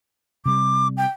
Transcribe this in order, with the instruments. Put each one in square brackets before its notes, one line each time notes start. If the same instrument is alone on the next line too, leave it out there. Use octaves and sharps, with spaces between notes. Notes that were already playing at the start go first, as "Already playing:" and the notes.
[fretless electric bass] C3 G3 [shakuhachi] D6
[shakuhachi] G5